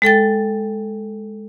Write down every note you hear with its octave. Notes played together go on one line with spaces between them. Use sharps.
G#3 A4 G5 A6